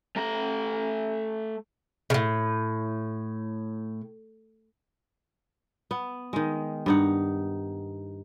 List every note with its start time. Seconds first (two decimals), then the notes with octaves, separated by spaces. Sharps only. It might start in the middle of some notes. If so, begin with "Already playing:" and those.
0.16 A3 A#5
2.10 A2 C#3
5.91 B3
6.33 D#3 G#3
6.86 G2 D#4 F#5